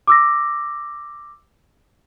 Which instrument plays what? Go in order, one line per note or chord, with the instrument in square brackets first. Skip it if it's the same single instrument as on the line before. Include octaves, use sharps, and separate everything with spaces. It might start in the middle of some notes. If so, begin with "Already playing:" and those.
[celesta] D6 E6 A#6